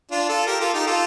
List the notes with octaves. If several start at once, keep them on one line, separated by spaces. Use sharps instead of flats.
D4 F4
F4 A4
G4 A#4
F4 A4
D#4 G4
F4 A4